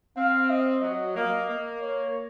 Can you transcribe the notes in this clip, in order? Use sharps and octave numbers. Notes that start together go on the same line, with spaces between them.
C4 F5
D#5
F#3 D#5
A#3 D#5
A#3
C#5